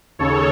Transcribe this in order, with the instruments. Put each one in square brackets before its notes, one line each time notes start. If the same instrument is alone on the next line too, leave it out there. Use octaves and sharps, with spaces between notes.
[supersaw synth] D#2 C#3 A4 C#5